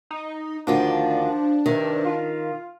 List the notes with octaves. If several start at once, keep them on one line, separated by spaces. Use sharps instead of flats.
D#4
D2 D#3 F3 D4 F4
G2 C3 D#3
F4